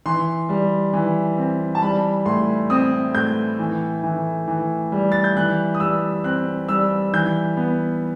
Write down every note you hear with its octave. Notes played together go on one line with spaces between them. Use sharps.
E3 C6
G3
E3
C4
A5
G3 B5
A2 C6
C4 D#6
A2 G6
E3
E3
E3
G3
A6
G6
E3 F#6
D#6
G3 E6
C4 F#6
G3 E6
E3 G6
B3